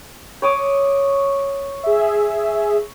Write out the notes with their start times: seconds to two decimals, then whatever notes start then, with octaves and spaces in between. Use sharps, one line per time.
0.42 C#5 D6 D#6
1.83 G#4 E5